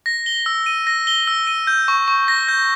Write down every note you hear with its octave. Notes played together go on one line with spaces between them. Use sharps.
A#6
G7
E6
D#7
A#6
G7
E6
D#7
G6
C#6
C#6
A#6
G6